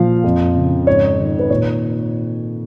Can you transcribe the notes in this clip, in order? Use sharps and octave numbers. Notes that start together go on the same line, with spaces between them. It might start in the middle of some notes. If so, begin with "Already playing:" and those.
Already playing: A#2 F3 F5
F2
C#3
G#2 C#5
D#3
B4
A#2 C#5